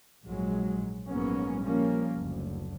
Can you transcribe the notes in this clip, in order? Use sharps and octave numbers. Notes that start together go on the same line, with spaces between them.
A#1 G#2 F#3 G#3
A#1 G#2 F#3 A#3 B3 C#4
F3 G3 A#3 C#4
F#1 D2